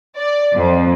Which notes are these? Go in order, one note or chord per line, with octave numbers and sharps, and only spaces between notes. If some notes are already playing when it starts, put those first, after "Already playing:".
D5
F2